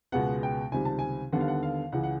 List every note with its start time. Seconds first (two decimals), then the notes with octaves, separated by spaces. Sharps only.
0.12 C#2 B2 G#3 B3 F#5
0.43 G5
0.72 C#2 C3 D#3 G3 G#5
0.85 A5
0.99 G#5
1.33 D#2 D3 G3 B3 F#5
1.40 F5
1.48 F#5
1.63 F5
1.92 C#2 C#3 E3 F#5
2.03 F#5